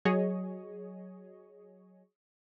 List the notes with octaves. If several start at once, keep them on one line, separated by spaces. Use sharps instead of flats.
F#3 G#4 C#5 D#5